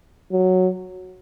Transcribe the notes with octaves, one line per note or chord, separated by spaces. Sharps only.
F#3